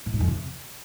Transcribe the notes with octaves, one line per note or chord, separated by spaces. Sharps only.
A#2
G#2
F2
C3